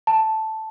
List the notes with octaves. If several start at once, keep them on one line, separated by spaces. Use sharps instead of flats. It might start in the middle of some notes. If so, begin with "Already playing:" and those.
A5